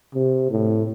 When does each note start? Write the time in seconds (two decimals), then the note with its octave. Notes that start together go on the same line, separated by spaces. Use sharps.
0.15 C3
0.51 A2